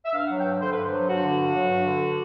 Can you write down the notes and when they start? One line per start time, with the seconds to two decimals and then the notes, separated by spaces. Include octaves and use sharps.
0.05 E5
0.14 G2 F5
0.26 F#3 F#5
0.38 G5
0.45 G2
0.61 D3 C5
0.72 G2 B4
0.84 C5
0.92 F#3
1.08 G2 F#4
1.23 D3
1.39 G2
1.54 F#3
1.70 G2
1.85 D3